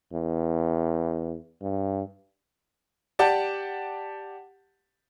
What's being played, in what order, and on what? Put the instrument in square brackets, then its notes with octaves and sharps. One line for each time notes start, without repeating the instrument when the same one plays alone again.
[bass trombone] E2
G2
[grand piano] G4 D5 F#5 A5